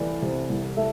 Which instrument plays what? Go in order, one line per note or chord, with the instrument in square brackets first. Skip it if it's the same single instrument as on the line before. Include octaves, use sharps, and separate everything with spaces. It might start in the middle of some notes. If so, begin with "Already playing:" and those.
Already playing: [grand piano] C2 E3 A3 B4 D5
C3
C2
A3 E5